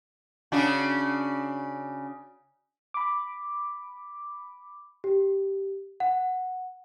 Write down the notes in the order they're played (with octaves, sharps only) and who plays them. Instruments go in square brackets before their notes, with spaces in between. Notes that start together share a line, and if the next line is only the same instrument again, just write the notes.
[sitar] C#3 D4 F#4
[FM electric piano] B5 D6
[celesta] G4
F#5